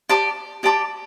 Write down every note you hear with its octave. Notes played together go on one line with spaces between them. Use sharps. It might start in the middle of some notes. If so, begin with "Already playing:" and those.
G4 D5 A5 D6
G4 D5 A5 D6